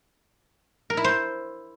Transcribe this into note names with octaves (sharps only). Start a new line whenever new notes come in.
A#4
E4
C5